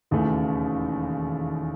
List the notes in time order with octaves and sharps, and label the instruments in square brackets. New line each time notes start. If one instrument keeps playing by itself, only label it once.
[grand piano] E1 D#2 C#3 E3 A3